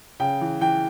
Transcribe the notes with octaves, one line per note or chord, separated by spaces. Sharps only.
C#3 G5
E3
E3 G5